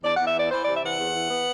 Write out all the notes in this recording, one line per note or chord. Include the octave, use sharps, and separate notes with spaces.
E2 D5
E2 F#5
E5
E3 D5
E3 C5
C3 D5
E5
E3 F#5
E2
E3
B3